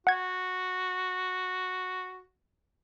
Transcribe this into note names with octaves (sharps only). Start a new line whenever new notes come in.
F#4 F#5 G#6